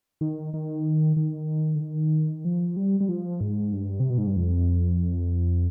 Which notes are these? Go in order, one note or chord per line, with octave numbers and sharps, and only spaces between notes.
D#3
D#3
D#3
D3
D#3
F3
G3
G3
F3
G#2
G2
C3
B2
G#2
G2
F2